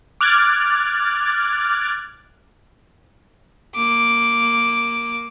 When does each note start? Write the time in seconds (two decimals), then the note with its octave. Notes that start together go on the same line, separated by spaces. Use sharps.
0.21 D6 F6 F#6 G#6 A6
3.75 A#3 D6